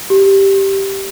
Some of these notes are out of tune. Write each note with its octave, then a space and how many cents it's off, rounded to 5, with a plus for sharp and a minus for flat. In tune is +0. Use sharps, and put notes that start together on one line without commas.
G4 -5